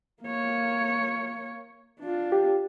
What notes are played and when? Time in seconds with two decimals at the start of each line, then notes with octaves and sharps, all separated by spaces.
0.23 A#3 C#5
2.00 D4 F4
2.32 G4